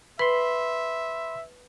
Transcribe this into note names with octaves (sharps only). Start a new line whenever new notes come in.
B4 E5 B5 C6